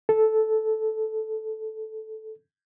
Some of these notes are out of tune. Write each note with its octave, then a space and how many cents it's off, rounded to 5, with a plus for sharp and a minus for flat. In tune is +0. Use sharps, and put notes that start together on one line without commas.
A4 -10